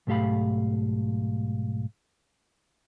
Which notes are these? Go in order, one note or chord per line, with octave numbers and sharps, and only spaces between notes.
B1 G#2 A3 G4 F5 B5